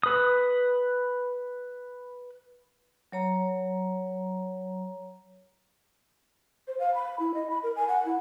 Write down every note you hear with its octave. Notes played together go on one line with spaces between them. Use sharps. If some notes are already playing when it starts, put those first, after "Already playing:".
B4 D#6
F#3 C#5 A#5
C5
F5
B5
E4
D#5
B5
A#4
G#5
F#5
E4